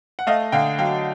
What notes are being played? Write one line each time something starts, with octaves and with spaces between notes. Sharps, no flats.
F#5
A3 D#5 F5
D3 F5 G5
F#3 F5 G5